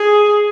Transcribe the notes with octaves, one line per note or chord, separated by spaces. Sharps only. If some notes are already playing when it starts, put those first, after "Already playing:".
Already playing: G#4